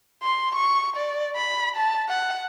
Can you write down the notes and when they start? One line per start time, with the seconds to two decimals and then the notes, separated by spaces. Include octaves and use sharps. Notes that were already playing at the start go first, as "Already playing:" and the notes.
0.23 C6
0.55 C#6
0.97 D5
1.36 B5
1.76 A5
2.09 F#5